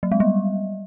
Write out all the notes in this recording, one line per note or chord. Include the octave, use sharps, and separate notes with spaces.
F#3
G#3
G3